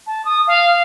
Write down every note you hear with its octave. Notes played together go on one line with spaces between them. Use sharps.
A5
D#6
F5